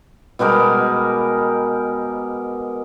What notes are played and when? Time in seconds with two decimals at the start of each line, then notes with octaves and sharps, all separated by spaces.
0.39 B2 G3 G#3 A#4